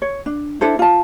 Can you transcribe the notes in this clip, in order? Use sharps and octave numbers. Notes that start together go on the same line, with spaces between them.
C#5
D4
D4 E4 A4 C5
F4 A5